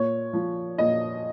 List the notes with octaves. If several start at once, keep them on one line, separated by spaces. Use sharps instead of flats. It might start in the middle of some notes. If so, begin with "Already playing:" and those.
Already playing: A#2 C#5
F3
A#2 D#5